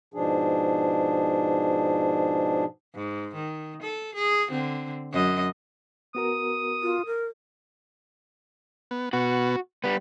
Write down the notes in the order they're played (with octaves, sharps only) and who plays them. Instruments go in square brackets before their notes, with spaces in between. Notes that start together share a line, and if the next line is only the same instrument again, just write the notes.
[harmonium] G#2 B2 F3 D4 G#4
[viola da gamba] G#2
D#3
A4
G#4
D3 C4
F#2 D#5
[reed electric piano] B3 F#4 A#4 [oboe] D#6
[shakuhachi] F4
A#4
[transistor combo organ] B3
[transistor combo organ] B2 B3 [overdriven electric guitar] F#4
[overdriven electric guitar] G3 B3 [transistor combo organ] B4